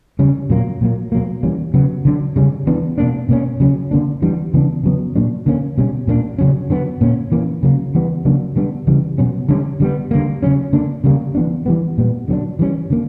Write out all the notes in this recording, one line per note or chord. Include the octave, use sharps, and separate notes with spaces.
C#3 G3 C#4
A#2 F#3 A#3
A#2 F#3 A#3
B2 F#3 A#3
E3 G3 A#3 C#4
C#3 F#3 B3
D3 F#3 B3 D4
C#3 G3 C#4
E3 B3 D4
B2 A#3 D4
B2 A#3 C#4
C#3 F#3 C#4
D3 A#3 D4
E3 G3 B3 D4
C#3 E3 B3 D4
C#3 F#3 B3
A#2 F#3 A#3 D4
D3 A#3 C#4
B2 G3 C#4
A#2 A#3 D4
C#3 F#3 C#4
D3 F#3 B3
A#2 A#3 C#4
E3 A#3 C#4
C#3 F#3 A#3
E3 G3 B3
C#3 F#3 A#3 D4
D3 G3 B3 D4
C#3 E3 G3
B2 F#3 C#4
D3 G3 C#4
D3 G3 B3
D3 G3 A#3
C#3 F#3 C#4
D3 A#3 D4
C#3 G3 A#3
E3 B3 D4
E3 G3 B3
A#2 G3 B3
D3 F#3 B3 D4
E3 G3 C#4
D3 A#3